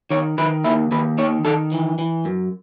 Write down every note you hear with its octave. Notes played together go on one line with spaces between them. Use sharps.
D#3 C#5
D#3 B4
D#2 E4
D#2 B4
D#3 C#5
D#3 A4
E3
E3
F#2